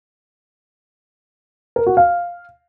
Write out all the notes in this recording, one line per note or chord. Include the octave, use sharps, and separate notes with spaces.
A#4
F#4
F5